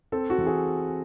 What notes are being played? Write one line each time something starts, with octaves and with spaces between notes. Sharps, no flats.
C4 A4
F#4
E3
G#4